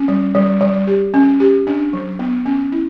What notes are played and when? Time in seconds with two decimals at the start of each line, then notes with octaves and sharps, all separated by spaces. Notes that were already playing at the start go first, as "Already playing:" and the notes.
Already playing: C#4
0.08 G3
0.35 G3
0.61 G3
0.87 G4
1.14 C#4
1.40 G4
1.67 D4
1.93 F#3
2.19 B3
2.46 C#4
2.72 E4